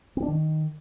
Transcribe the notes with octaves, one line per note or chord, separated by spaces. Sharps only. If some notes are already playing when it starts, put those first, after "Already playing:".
C4
D4
D#3